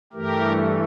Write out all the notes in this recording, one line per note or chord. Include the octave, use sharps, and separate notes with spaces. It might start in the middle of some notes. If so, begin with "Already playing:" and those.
G2 E3 A3 G4 A#4